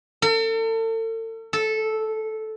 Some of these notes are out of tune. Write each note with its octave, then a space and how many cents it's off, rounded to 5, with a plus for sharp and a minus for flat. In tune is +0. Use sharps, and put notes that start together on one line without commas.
A4 +40
A4 -10